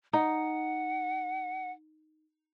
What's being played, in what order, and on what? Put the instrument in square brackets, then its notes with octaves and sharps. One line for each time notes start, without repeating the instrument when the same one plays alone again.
[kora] D#4 [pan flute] F#5